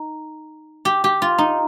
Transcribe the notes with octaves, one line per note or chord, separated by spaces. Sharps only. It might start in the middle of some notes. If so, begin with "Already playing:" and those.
Already playing: D#4
G4
G4
F4
D#4